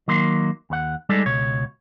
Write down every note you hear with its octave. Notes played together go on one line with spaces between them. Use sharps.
D#3 F#3 A#3 C6
D#2 F#5
G3 G#3 D#4 A4 D5
C#2 B2 C#5